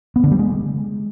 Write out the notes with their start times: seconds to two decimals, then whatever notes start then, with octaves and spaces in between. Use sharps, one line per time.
0.16 B3
0.24 D3
0.31 G3
0.39 G#3